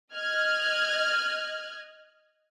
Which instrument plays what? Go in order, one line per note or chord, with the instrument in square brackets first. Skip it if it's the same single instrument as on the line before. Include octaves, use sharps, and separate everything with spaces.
[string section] D#5 F6 F#6 G#6